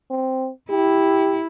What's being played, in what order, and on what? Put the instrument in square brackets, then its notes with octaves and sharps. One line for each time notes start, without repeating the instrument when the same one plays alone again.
[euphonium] C4
[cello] E4 [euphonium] G4